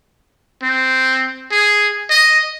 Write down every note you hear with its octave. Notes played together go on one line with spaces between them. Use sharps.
C4
G#4
D#5